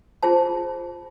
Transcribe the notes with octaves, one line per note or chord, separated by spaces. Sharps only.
F4 G#4 C5 A5